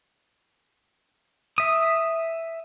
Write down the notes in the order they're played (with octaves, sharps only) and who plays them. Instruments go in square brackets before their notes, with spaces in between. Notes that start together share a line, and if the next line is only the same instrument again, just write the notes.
[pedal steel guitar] E5 D#6